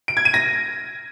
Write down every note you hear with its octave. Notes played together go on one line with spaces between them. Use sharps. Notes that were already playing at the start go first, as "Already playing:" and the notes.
D7
G#6
D#7
A#6